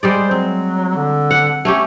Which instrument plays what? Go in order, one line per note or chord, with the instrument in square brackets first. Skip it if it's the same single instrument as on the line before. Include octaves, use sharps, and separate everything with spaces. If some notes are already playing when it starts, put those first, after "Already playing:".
[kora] G3 G#3 D5 [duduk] C5
[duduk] F#3 [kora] C4
[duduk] D3
[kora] F#5
A3 C#4 G4